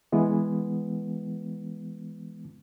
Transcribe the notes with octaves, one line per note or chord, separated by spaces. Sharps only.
E3 G#3 B3